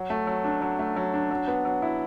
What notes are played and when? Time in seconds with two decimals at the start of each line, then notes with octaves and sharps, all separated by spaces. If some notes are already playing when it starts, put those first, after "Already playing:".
Already playing: F#3
0.10 A3
0.27 F#3
0.44 D4
0.61 F#3
0.79 A3
0.96 F#3
1.14 D4
1.31 F#3
1.48 B3
1.65 F#3
1.82 E4